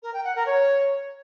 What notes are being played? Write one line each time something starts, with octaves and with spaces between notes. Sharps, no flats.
A#4
G5
F#5
A#4
C#5